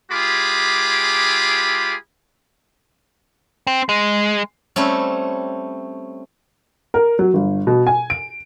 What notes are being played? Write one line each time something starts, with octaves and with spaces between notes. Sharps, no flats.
G#3 F4 G4 G#4 B5 D6
C4
G#3
G3 A3 C4 C#4
A#4
F#3
G1
B2
G#5
D7